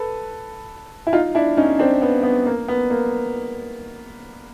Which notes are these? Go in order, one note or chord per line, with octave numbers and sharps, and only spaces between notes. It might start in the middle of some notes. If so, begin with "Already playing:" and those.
Already playing: A4 B4
E4
D#4 F4
D4 E4
C#4 D#4
C4 D4
B3
B3
A#3
B3
A#3